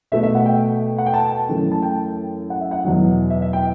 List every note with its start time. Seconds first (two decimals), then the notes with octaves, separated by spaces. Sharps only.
0.12 B2 A3 E5
0.23 E5
0.35 F#5
0.46 G5
0.98 F#5
1.06 G5
1.14 A5
1.49 F#2 E3 A3
1.71 A5
1.82 G5
2.50 F#5
2.61 E5
2.71 F#5
2.85 E2 B2 F#3
3.30 E5
3.42 E5
3.53 G5